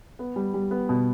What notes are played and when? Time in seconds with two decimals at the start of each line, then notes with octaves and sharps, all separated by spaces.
0.19 B3
0.36 G3
0.54 G3
0.71 B3
0.89 B2